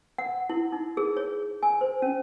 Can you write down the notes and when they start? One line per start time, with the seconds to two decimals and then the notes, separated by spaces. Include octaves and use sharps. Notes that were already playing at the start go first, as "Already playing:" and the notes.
0.18 F#5
0.50 E4
0.72 D#4
0.97 G#4
1.17 C#5
1.63 G#5
1.81 C5
2.02 C#4